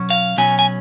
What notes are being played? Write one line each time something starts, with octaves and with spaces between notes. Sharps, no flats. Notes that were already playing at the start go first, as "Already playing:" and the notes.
Already playing: B2 F#3 C#4
F5
B1 B2 F#3 C#4 G#5
G#5